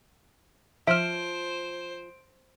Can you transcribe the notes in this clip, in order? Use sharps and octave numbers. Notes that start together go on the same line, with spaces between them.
F3 C5 E5 F6 D7